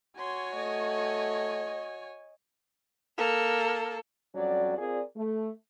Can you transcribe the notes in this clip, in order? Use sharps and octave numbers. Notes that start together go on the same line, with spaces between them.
F#4 C#5 G#5 C6
A3 D#5
A#3 A4
F2 F#3 G3 C#4 F#4 D5
C4 F4 G#4 A#4 D5
A3